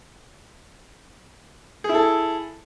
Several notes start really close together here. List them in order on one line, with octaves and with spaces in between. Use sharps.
G#4 E4 A4